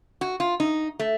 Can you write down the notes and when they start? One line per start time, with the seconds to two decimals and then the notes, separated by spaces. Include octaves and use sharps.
0.21 F#4
0.40 F4
0.60 D#4
0.99 A3